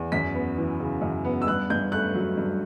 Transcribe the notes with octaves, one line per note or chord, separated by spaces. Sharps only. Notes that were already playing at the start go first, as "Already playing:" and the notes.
Already playing: E2
F#2 B6
B3
E3
C#3
F#2
B3
E6
G2 F#6
G2 G6
A3 F#6
F#3
G2